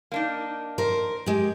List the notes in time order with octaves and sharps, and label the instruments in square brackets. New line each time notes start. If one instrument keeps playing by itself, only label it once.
[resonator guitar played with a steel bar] A#3 D4 D#4
[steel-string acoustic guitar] A#4 C5
G#3 G4